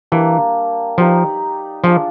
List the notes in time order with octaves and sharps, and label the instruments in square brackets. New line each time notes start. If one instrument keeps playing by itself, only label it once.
[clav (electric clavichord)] E3 [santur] G3 A#3 D4
[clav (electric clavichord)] F3 [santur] D#4 G4 B4 D5
[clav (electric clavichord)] F3 [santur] D4 F4 G#4